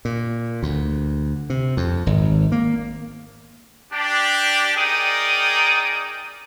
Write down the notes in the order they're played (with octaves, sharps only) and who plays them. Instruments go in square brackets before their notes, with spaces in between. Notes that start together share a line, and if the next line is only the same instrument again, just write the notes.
[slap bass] A#2
D2
C3
F2
G#1
A#3
[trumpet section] D4 G4
D#4 G#4 A#4 D5 G5 D#6